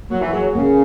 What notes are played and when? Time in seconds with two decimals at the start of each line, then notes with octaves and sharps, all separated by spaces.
0.10 F#3 A#3
0.21 E3
0.33 F#3 G#4
0.55 C#3 A#3